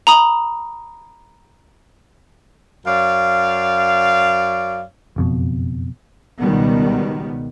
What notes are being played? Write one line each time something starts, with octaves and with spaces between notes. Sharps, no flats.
A#5 B5 D#6
F#2 C#5 D5 F5
F#1 F2 B2
C#2 B2 D#3 G3 B3